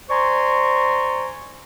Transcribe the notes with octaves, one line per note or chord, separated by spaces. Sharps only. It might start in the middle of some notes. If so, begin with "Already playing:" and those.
C5 D5 G#5 A#5 C6 C#6